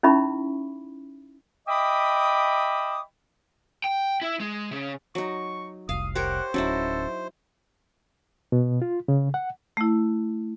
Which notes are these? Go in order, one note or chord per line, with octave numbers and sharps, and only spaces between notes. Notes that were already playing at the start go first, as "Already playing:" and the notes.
C#4 D#4 E4 E5 B5 C#6
D#5 E5 G5 B5 D6 D#6
G5
E4
G#3
C#3
F#3 D#4 C#6
F1 C2 F5 D#6
G4 A#4 C5 C#5 F#5
D1 F#3 C#4 D#4 E4 A4
B2
F4
C#3
F#5
A3 E4